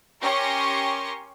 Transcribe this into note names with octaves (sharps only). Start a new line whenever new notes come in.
C#4 G4 A#4 C6 C#6 A#6